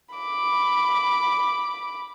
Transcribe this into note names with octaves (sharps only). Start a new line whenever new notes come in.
B5 D6